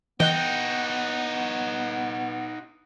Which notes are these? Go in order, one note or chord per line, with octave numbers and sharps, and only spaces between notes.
E3 B3 D#4 F#4 D#5 G5 F#6